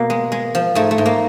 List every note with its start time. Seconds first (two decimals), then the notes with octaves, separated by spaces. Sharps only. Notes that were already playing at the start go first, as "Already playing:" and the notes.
Already playing: B2 A#3
0.10 G#3
0.32 G#3
0.55 F3
0.75 G#2 A3
0.91 A3
0.98 G#2
1.06 A#3